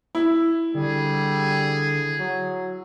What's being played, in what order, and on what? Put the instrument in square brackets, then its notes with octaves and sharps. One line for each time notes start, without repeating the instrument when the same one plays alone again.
[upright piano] E4
[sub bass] D3 [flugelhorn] G3 [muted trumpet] G#4
[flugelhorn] F#3